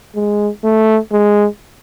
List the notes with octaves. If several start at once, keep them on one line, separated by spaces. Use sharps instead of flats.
G#3
A3
G#3